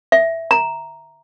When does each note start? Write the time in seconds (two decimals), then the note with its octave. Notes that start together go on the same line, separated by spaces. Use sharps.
0.12 E5
0.51 A#5